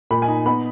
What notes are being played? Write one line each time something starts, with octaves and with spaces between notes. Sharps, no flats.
A#2 B5
G#5
D#4
B3 B5